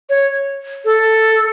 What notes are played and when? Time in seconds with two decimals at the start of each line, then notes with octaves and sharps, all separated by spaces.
0.10 C#5
0.85 A4